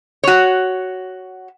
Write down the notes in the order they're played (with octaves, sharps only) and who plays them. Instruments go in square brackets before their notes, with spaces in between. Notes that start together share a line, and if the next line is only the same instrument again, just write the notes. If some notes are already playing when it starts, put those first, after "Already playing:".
[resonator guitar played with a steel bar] F#4 C#5